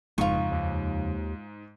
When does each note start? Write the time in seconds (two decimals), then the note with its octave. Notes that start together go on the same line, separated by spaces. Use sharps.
0.18 F#1 F2 G#2 C#3 F3 F4 C#6
0.51 D#2